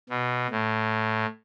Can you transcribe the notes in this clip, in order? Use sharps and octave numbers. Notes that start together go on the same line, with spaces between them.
B2
A2